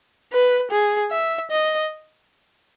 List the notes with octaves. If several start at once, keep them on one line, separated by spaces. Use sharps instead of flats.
B4
G#4
E5
D#5